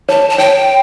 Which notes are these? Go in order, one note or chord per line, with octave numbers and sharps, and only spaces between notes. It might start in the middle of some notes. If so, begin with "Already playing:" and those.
C#5 A5
A5
C#5 G5